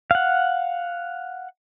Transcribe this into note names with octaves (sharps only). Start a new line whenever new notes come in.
F5 F#5